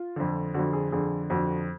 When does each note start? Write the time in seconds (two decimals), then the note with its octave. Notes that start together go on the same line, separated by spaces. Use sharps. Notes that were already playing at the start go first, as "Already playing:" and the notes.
Already playing: F4
0.16 F2 D3
0.54 F2 D3 F#4
0.73 G#4
0.92 F2 D3 G#4
1.30 F2 D3 F#4